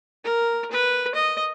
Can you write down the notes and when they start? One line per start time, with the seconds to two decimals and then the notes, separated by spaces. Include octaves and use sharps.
0.24 A#4
0.71 B4
1.15 D#5